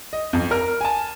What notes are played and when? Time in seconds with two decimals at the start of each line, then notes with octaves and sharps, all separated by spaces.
0.13 D#5
0.33 F2
0.51 A#4 F6
0.81 G#5 A5